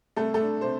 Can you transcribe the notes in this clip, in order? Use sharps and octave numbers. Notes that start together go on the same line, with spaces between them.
C2 A3 A4
A3 A4
D4
C3 C5